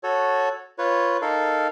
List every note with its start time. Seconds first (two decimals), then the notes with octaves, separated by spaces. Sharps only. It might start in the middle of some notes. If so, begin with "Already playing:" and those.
0.03 F#4 A4 C#5
0.78 F4 B4 C#5
1.22 D#4 A4 A#4 F5